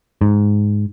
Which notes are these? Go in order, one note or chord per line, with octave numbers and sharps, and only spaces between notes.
G#2